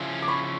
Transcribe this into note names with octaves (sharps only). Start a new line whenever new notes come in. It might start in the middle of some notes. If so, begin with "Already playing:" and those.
Already playing: C#3 F3 C#4 E4
D6
B5 C#6